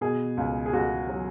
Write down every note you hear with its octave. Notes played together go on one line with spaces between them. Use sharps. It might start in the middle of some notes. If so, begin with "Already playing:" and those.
B2 G#4
C#2
G#4
C#2 F#4
F#3